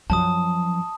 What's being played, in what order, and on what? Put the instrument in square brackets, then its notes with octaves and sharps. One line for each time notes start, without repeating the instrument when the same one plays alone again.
[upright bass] F#2 F3 [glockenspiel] A5 D#6